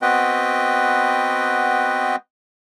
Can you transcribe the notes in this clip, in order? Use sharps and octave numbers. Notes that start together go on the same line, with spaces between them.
B3 C4 F#4 B4 D#5 G5